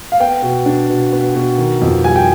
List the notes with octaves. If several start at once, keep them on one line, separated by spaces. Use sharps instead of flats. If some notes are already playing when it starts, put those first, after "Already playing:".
F5
B3 G5
B2
D4
B2
B3
B2
D#3
F2
G3 G#5
G5